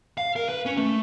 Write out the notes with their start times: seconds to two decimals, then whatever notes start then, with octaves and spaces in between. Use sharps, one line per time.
0.18 F5
0.36 A#4
0.49 B4
0.66 C#4
0.77 A3